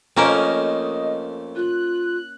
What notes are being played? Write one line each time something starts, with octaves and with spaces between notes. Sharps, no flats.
F2 A3 A#3 C#4 A#4 C5 D#5
F4 F#6